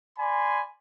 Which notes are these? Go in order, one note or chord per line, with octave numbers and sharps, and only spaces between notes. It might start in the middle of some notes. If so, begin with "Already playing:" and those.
D5 G#5 B5 C6